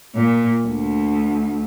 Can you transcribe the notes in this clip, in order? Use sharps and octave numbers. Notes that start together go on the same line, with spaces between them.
A#2
D2